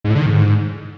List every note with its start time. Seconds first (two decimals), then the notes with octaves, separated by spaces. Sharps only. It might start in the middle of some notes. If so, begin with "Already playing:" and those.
0.04 G#2
0.10 A2
0.15 D3
0.21 D#3
0.26 G#2